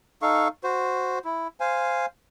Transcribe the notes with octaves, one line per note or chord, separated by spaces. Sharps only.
D#4 A4 F5 C#6
F#4 C5
E4
C5 F5 G#5